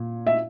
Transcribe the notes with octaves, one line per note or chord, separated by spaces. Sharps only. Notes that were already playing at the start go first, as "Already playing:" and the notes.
Already playing: A#2
E5